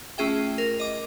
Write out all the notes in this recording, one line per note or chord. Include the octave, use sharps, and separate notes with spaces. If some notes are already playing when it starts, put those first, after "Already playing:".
A3 C#4 F4 G#4 E5 G5
A#4
D#5 D6